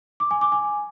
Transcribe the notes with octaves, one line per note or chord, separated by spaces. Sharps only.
D6
G#5
D6
G#5